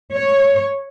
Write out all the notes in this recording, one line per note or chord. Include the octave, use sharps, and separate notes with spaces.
C#5